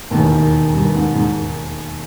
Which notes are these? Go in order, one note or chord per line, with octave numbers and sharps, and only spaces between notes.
E1 D#2 A2 D#3
G2
G#2
G#2